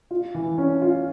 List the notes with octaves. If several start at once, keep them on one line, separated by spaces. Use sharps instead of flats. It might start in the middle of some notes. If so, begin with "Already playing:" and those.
F4
E3
C#4
F4